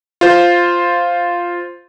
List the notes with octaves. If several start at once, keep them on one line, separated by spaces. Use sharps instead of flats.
F4 C5